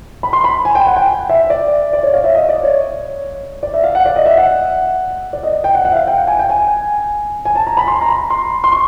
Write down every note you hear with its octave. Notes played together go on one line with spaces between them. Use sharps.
B5
C6
B5
G#5
G5
F#5
G5
E5
D5
D5
C#5
F5
E5
D#5
D5
C#5
D5
E5
F5
F#5
D5
D#5
E5
F#5
D5
D#5
G5
F#5
F#5
E5
F5
G5
G5
G#5
G5
G#5
G#5
A5
A#5
B5
C6
A#5
B5
C6
C6
C#6